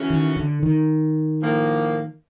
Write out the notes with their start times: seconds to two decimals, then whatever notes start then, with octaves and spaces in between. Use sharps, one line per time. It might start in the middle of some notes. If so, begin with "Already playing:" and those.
Already playing: C#3 E3 A3 C#4 F#4
0.10 D#3
0.37 D3
0.63 D#3
1.41 A2 F3 A#3